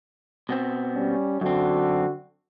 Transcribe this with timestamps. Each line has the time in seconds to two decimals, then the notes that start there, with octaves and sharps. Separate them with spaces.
0.49 B2 B3 C4
0.95 G3 C#4
1.41 F#2 D3 C4 F#4